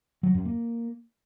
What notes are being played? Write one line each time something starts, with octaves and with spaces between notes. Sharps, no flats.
F#3
F#2
A#3